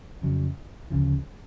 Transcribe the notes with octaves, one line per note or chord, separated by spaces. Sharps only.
F2 C#3 F#3
D2 C#3 F3